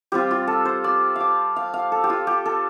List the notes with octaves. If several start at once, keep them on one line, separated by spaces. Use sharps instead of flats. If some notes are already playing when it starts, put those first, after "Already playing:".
G3 C4 F4 G4
F4
A4
C5
D5
D5 F5
F5
F5
A4
G4
F4
G4
A4